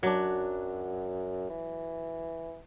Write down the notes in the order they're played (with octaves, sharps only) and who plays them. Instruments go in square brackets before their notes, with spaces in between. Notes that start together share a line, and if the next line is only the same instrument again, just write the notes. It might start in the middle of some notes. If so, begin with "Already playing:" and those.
[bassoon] F#2 [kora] F#3 D4
[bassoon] E3